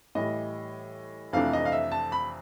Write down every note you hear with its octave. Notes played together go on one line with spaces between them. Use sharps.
A2 E3 G3 D#5
F2 C3 E3 A3 D4 F5
D#5
F5
E5
A5
B5